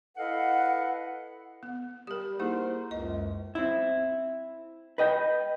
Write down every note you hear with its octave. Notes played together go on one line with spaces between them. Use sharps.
E4 A4 B4 D#5 F5 F#5
B3
G3 G4 A#4
A#3 D#4 E4 G#4 A#4 C5
C#2 F#2 D#5
C4 E4
B4 D#5 G5